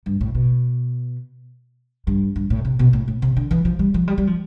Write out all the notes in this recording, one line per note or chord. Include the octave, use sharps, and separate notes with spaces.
G2
A2
B2
G2
G2
A2
C3
B2
A2
A2
C3
D3
E3
F3
G3
F3
G3
G3
F3